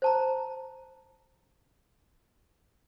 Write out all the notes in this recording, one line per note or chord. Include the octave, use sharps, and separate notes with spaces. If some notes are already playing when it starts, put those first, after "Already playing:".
C5 A5 A#5